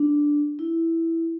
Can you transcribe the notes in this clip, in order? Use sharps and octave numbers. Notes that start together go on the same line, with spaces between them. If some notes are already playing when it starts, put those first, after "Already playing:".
Already playing: D4
E4